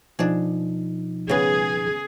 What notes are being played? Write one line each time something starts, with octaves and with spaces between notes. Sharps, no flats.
B2 F3 D4 D#4 G#4
C#3 B3 G#4